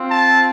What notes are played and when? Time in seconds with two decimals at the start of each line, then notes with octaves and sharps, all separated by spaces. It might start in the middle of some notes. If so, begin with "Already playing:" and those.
Already playing: C4 F4
0.09 A5